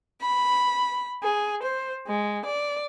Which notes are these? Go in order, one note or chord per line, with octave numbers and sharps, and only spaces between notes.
B5
G#4
C5
G#3
D5